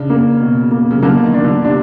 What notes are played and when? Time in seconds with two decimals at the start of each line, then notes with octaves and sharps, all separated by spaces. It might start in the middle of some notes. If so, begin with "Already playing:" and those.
Already playing: C#3 D4
0.10 A#3
0.40 B2
0.71 A#3
0.91 C#3
1.02 D3 A#3
1.24 D#3
1.34 D#3 D4
1.44 D3
1.64 C3 D4